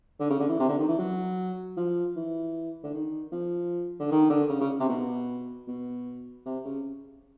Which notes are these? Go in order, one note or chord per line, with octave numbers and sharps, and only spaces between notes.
D3
C#3
D3
E3
C3
D3
D#3
E3
F#3
F3
E3
D3
D#3
F3
D3
D#3
D3
C#3
C#3
C3
B2
B2
C3
C#3